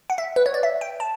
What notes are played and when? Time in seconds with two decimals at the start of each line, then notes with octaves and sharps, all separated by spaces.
0.10 F#5
0.18 E5
0.36 B4
0.46 C#5
0.54 D5
0.63 E5
0.81 G5
1.00 A5